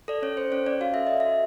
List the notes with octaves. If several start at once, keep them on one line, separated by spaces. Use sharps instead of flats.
A4 D5
C#4 C#5
A4 C5
C#4 C#5
C#4 D5
F#4 F5
A4 E5
A4 D#5
E5
F#4